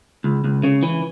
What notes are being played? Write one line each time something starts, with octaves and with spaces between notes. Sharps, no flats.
C#2
C#2
C#3
E3